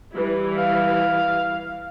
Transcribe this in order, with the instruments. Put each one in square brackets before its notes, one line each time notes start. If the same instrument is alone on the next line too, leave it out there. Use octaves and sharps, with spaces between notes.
[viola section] E3 G3 E4
[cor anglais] F5